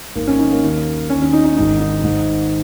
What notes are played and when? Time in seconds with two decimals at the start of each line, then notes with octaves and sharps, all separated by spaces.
0.15 G#1 G#2 D#3 A#3
0.27 C#4
0.39 D#4
0.51 A#3
0.62 D#2 D#3
1.09 D#2 D#3 C#4
1.22 C#4
1.33 D#4
1.44 D#4
1.57 G#1 G#2 D#3 D#4
1.80 D#4
2.03 G#1 G#2 D#3